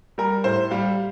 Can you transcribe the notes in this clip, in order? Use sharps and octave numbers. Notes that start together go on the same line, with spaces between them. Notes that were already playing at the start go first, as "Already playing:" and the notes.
G3 A#4
A2 C5
G3 F5